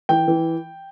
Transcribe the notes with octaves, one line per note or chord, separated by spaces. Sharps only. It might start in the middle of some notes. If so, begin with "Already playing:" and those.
E3 G5
E3